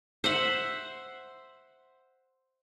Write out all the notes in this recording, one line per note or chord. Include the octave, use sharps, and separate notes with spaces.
C5 E5 F#5